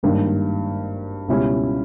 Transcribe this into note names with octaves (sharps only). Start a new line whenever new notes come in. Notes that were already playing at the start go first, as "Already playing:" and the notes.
G#1 G2 D#3 A#3
C#2 B2 G3 C#4 E4